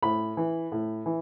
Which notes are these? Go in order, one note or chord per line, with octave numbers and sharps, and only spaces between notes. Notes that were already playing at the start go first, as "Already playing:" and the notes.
A2 B5
E3
A2
E3